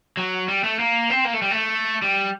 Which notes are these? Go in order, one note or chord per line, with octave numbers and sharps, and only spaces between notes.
F#3
G3
A3
A#3
C4
A#3
A3
G3
A3
G3